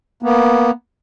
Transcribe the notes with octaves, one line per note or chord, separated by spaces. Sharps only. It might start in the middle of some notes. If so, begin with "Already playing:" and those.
A#3 B3